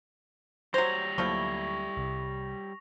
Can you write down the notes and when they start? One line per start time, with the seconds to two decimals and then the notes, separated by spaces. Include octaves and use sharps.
0.74 F#3 G3 C5 C#5 A#6 F7
1.18 D2 F3 F#3 A3 A#3 E4 C#6
1.97 C2